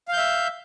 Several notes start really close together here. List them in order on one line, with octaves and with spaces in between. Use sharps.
F5 G6 E5